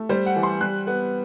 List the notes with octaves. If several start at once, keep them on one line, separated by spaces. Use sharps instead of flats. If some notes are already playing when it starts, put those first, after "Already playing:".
Already playing: A3
G3 C5
F#5
E3
C6
G3 F#6
B3